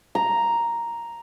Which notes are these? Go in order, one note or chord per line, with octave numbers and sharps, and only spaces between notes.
A#5